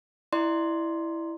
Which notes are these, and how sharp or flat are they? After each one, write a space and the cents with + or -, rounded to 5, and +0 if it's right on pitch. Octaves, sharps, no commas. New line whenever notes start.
E4 +0 D5 +25 C6 +0